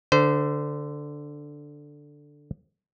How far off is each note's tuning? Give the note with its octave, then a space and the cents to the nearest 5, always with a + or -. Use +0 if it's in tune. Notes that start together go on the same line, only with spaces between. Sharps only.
D3 +0 C5 -25